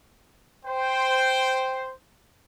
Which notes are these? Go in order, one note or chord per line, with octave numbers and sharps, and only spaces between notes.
C5 G5